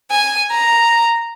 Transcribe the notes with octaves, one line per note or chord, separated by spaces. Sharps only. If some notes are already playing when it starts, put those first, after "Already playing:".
G#5
A#5